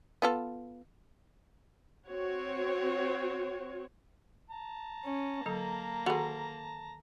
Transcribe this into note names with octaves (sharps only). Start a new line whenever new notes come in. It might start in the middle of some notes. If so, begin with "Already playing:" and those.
B3 F4 A4
C4 F#4 C#5
A5 A#5
C#4
D3 F#3 A#3 A4
D#3 F#4 G#4 A4 B5